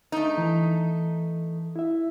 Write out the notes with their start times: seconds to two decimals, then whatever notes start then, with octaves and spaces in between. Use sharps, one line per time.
0.12 A3 D#4
0.38 E3
1.76 E4 E5